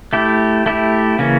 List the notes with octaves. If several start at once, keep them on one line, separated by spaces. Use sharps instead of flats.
A3 E4 G4
A3 E4 G4
C#3 E3 A#3 C#4